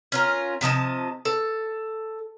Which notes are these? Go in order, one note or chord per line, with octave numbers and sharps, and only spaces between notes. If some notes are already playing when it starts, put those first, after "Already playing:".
C#4 F4 A#4
C3 F3 D#5 A5
A4